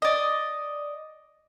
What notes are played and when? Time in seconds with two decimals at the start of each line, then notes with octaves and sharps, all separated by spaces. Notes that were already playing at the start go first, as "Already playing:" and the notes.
0.02 D5 D#5